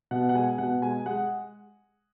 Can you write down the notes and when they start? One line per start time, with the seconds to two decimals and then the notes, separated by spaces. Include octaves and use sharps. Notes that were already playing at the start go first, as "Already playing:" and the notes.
0.11 B2 F#5
0.29 F#5
0.35 G#3 G#5
0.58 B2 F#5
0.82 G#3 G#5
1.06 G#3 F#5